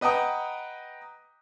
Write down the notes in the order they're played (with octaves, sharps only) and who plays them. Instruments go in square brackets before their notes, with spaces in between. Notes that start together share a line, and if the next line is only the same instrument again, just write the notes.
[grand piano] B4 D#5 F#5 G5 A#5 D#6